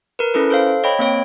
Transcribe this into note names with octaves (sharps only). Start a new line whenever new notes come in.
A#4 B4
C#4 E4 A4 B4
A4 C5 F5
C#5 D#5 G5 B5
A#3 C4 C#5 D7